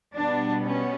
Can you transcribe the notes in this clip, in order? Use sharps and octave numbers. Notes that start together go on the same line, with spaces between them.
B2 G3 B3 D4
C#4